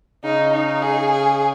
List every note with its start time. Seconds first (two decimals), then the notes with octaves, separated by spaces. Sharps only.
0.24 C#3 D#4
0.53 D#4
0.82 G#4
1.12 G#4